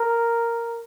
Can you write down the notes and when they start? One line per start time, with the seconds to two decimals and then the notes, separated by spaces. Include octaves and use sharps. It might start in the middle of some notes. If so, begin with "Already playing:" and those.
Already playing: A#4